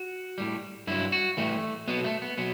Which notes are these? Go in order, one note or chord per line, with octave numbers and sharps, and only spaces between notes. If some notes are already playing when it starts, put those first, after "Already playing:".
Already playing: F#4
A2 G3
G2 F#3 E4
F#4
A2 E3 G3 A3
B2 F#3 B3
A3
B3
B2 F#3 B3